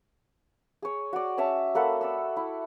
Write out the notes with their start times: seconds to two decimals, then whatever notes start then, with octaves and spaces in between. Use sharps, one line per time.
0.82 G#4 C#5
1.13 F#4 D5
1.37 C#4 C#5 E5 A5
1.75 A#3 A4 F#5 B5
2.01 D5 B5 E6
2.37 E4